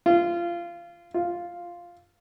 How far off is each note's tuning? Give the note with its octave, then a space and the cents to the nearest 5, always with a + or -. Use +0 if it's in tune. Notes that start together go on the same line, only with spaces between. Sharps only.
F4 -20
F4 +0